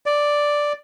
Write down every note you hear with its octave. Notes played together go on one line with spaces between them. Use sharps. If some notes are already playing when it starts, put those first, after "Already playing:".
D5